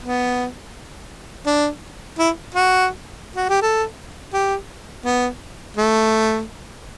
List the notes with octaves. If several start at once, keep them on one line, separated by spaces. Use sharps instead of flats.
B3
D4
E4
F#4
F#4
G4
A4
G4
B3
A3